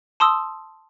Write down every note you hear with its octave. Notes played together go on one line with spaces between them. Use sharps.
A5 C6 D#6 E6